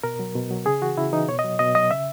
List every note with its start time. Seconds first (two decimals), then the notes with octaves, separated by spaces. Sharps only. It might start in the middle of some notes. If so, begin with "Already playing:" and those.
0.03 B2 A#4
0.19 F#3
0.35 B2
0.51 F#3
0.66 C#3 G#4
0.82 E3 F#4
0.97 C#3 E4
1.13 E3 D#4
1.28 B2 C#5
1.39 D#5
1.44 F#3
1.59 B2 D#5
1.75 F#3 D#5
1.91 C#3 E5